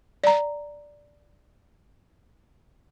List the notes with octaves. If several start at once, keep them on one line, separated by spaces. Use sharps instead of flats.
D5 A#5